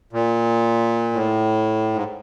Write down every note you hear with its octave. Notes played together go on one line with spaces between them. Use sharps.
A#2
A2
G#2